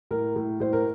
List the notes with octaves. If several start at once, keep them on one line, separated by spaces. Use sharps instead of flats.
A2 A#4
A2
A2 C5
A#4